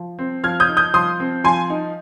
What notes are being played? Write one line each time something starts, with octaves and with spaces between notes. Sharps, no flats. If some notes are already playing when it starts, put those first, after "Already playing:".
Already playing: F3
C4
F3 F6 G#6
D#6 G6
D#4
D#6 G6
F3 C6 D#6
C4
F3 G#5 C6
D#4